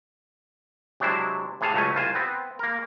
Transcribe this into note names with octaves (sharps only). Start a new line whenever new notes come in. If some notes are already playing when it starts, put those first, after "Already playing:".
C3 F#3 G#3 D4 E4 C5
A2 C3 G#4 A4 F5 A5
C#2 F#3 A3 C#4 G#5
C2 F4 C5 G#5
B3 C4
A#3 A#4